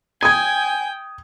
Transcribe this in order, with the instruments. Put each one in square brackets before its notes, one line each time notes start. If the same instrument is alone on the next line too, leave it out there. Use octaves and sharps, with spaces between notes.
[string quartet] G5 [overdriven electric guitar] G#5 [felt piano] D#6 G#6